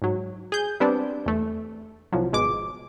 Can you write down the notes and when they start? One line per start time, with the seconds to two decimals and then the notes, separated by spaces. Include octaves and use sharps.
0.02 G#2 F#3
0.52 G#4 G6
0.80 G3 B3 C4 D4
1.26 E2 A3
2.12 C2 F3 F#3
2.32 G#1 B2 G#3 D6